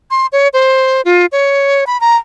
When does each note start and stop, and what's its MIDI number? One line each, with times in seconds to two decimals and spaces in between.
0.11 0.27 84
0.33 0.48 73
0.53 1.02 72
1.05 1.26 65
1.32 1.84 73
1.87 2.00 83
2.01 2.16 82